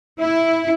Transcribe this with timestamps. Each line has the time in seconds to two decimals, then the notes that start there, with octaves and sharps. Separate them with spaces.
0.20 E4